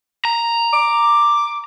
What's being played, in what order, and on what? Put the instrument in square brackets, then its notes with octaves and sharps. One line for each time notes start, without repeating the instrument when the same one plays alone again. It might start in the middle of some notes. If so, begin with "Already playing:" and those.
[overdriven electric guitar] A#5
[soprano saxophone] D6